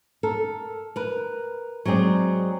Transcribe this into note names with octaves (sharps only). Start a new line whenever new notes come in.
A4 A#4
A#4 B4
F#3 G#3 C4 G#4 D5